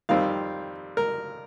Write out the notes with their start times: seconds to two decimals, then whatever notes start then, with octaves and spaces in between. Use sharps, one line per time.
0.09 F2 D#3 G3 C4 F5
0.97 A#4